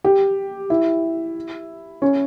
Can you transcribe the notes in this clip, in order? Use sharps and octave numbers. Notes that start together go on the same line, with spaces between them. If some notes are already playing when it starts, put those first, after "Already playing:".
G4
E4
C#4